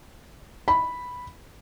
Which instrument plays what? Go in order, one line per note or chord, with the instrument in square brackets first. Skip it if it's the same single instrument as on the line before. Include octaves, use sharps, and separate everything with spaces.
[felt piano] B5